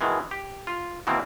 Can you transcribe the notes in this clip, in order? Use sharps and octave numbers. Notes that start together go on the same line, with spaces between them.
B2 D#3 E3 G#3
G4
F4
B2 D#3 E3 A#3 C4